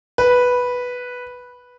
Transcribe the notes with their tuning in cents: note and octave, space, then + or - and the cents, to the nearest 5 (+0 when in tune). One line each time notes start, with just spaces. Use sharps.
B4 -5